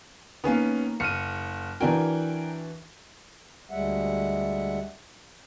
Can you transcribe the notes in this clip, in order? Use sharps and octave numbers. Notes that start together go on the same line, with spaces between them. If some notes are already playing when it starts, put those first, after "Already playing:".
D#3 A#3 B3 C#4 F5
F#1 F6 C#7 D#7
E3 D4 F#4 A#4 G5 G#5
D2 G3 G#3 E5 F#5